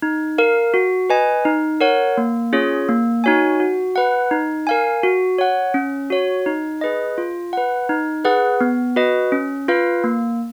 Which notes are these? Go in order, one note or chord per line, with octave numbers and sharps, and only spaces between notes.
D#4
A#4 F5
F#4
B4 D#5 G#5
D#4
A#4 C#5 F#5
A#3
C#4 F4 G#4 C#5
A#3
D#4 F#4 C#5 G#5
F#4
B4 F#5
D#4
A#4 F5 G#5
F#4
C#5 F#5
C#4
F#4 C#5
D#4
G#4 B4 D#5
F4
B4 F#5
D#4
G#4 B4 F#5
B3
F#4 B4 D#5
C#4
F4 B4 F5
A#3